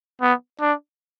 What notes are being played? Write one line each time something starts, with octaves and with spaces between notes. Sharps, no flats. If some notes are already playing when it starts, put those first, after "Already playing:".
B3
D4